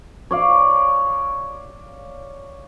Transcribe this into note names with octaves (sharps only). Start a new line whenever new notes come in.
C#5 D5 F5